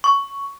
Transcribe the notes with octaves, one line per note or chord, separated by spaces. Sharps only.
C#6